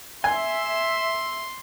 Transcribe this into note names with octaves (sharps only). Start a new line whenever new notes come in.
E5 G#5 C6